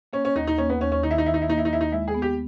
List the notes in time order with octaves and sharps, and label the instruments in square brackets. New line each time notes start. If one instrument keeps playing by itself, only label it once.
[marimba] A#3 [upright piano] C#4
[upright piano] C#4
[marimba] D#2 [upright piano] D#4
[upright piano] D#4
[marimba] A#3 [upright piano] C#4
[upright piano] B3
[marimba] D#2 [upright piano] C#4
[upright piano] C#4
[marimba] D#3 [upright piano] D#4
[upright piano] E4
D#4
[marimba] D#3 [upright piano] E4
[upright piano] D#4
E4
[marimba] A#3 [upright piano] D#4
[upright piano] E4
D#4
[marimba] D#2 [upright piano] E4
[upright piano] D#4
[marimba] G#3 [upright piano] E4
[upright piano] G#4
[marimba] B3
[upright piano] G4